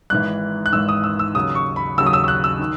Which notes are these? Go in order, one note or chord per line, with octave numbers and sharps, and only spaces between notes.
G#1 G#2 E3 F#6
F#6
G#1 G#2 E3 E6
D#6
E6
E6
D#2 C#3 F#3 D#6
C#6
B5
D#2 C#3 F#3 E6
D#6
E6
E6
F#6
E6
D#3